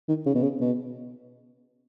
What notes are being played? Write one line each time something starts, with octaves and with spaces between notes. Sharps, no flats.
D#3
C#3
B2
C#3
B2